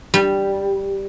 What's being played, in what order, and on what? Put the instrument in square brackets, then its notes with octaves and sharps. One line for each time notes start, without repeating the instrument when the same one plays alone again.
[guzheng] G3